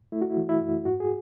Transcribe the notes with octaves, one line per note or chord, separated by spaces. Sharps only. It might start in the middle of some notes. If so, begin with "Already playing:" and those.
A3 E4
F#4
E4
E3
E4
F#2
G#2 F#4
G#4